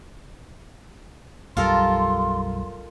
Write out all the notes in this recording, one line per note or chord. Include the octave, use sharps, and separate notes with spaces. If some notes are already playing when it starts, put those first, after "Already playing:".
B1 F#2 G3 F4 A4 A#4 C6